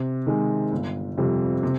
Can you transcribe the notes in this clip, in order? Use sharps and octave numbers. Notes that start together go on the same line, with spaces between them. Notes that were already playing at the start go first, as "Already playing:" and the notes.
Already playing: C3
D#3 G#3
G1
F2 C3 G3
C3